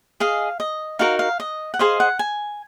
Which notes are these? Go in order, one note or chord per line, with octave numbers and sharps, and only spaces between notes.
G#4 D#5 F5
D#5
D#4 F#4 A#4 F5
F5
D#5
F#5
G#4 C5 D#5 F5
F#5
G#5